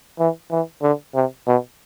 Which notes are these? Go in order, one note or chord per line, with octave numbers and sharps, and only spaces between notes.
E3
E3
D3
C3
B2